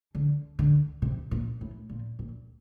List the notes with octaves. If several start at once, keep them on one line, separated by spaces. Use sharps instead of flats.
D3
D3
C3
A#2
A2
A#2
A#2